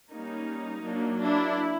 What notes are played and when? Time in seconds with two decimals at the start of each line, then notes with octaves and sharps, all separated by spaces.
0.11 G3 A#3 C#4 D#4
0.84 F#3 A#3 D4
1.21 D4 E4